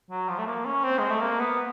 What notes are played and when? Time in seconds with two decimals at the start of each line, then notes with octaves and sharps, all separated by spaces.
0.10 F#3
0.29 F3
0.38 A3
0.47 A#3
0.65 C#4
0.84 C4
0.98 G#3
1.10 A3
1.21 A#3
1.39 B3